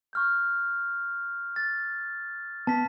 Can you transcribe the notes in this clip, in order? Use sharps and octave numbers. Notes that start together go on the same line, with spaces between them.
C#6 F6 G6
A6
B3 A5 B6